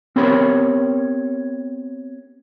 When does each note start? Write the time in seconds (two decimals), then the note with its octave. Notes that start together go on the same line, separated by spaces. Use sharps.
0.16 B3 C4 G4 A#4 C#5 B5